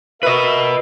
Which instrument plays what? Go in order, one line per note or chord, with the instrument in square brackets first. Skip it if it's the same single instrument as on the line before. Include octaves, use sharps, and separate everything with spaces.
[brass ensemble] A#4 E5 [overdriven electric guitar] B4 D#5